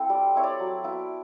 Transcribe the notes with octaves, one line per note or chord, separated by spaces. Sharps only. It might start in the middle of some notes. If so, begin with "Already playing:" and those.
Already playing: C4 E4 A4
G3 D5
C4 E4 C#5
D5
F#3
B3 E4